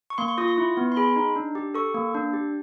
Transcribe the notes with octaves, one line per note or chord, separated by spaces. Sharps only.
C#6
A#3 C6
C#6
F4 D#6
C6
E4
B3
C6
G#4 B5
D#4
D4
G4
A4 C#6
A#3
D4
G4